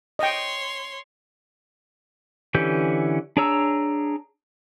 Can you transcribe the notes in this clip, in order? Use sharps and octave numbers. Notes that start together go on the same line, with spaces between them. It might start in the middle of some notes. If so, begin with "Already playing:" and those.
C#5 D#5 G5 C6
D3 E3 C#4 G4 G6
D4 G#4 C#5 A#5 E6